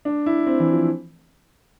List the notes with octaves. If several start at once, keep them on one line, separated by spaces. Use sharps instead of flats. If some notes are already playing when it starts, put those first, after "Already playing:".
D4
E4
C4
E3
F3